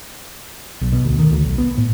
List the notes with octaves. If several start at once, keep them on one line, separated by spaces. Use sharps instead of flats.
B1
B2
D2
D#3
D2
B1
B3
A2